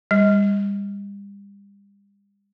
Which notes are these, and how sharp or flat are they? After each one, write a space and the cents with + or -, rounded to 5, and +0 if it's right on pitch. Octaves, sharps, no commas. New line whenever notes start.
G3 +35